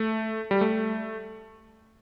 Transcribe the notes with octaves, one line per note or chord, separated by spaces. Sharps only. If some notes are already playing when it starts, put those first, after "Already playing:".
Already playing: A3
G3
A3